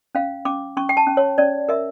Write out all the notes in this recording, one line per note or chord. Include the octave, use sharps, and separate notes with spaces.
C#4 F5
C#4 D6
C#4 C#6
G5
A5
C#4
C#5
C#4 D5
A#4 E5